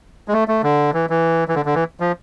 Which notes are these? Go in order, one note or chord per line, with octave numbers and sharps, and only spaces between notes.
G#3
A3
A3
D3
E3
E3
E3
D3
D3
E3
F3